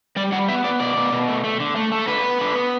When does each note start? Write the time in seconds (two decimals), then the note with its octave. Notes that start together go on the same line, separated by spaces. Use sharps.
0.16 G3 D5
0.32 G3 F#5
0.48 B3 E5
0.64 B3 D5
0.80 B2 D5
0.96 B2
1.12 B2
1.28 A3
1.44 A3
1.60 D3
1.76 A3
1.92 A3
1.99 A4
2.07 D3 B4
2.24 B3
2.40 D3
2.56 B3